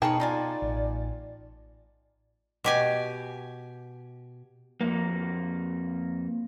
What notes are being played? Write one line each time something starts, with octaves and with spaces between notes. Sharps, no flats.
B2 D#4 G#4 A#4 B4 C#5 G5 A5
D#4 F4 D5 G#5
A1
B2 G4 G#5
F2 A#3